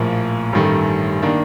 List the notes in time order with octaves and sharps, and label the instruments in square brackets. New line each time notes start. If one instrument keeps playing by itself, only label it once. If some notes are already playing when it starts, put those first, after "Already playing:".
Already playing: [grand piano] A#1 A2 F3 A#3
A1 G2 D#3 A3
D#3 A#3 D4